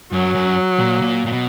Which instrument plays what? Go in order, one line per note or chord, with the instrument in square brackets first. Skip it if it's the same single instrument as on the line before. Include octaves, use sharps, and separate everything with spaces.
[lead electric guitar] F#2 [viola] F#3
[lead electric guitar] F#2
A#2
A#2
A#2
B2